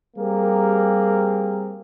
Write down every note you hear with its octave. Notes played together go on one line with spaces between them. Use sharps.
G3 A#3 C4 G4 G#4 A#4